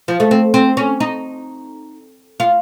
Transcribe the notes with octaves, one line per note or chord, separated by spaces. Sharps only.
F3
A3
C4
C4
C#4
D#4
F4